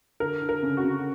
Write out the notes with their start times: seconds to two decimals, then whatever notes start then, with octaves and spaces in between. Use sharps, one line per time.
0.20 D3 A#4
0.42 D3
0.49 A#4
0.63 C#3
0.77 F#4
0.84 C#3